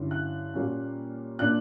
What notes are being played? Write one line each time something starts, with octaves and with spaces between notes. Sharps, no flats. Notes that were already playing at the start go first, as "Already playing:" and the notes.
Already playing: G2 D3 F#3 C#4 E4
F#6
A#2 G3 A#3 C#4
A#2 A#3 D4 F#6